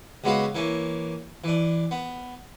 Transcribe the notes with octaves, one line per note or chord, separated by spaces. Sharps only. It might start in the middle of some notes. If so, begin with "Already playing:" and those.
C#2 G#3 B3 F#4 B4 F5
E3 A#3 C#4
E3 D4
B3